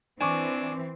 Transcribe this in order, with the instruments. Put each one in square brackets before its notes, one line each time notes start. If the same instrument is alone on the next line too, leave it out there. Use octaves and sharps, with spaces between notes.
[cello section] E3 C4 [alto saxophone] D4 [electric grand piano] G#5 C#6 D6